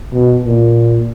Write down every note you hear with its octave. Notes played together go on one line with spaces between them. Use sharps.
B2
A#2